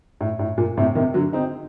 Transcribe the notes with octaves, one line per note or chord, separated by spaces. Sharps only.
A2
A2
A#2
A2 C3
C3 D#3
D3 F#3
C4 D#4